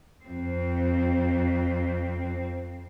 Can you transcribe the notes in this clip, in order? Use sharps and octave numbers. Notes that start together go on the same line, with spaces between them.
F2 C4